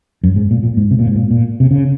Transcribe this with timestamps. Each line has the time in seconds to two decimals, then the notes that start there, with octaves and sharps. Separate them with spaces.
0.23 F#2
0.36 G#2
0.51 A#2
0.63 A#2
0.77 G#2
0.91 C3
0.99 A#2
1.07 G#2
1.16 A#2
1.31 A#2
1.60 C3
1.71 C#3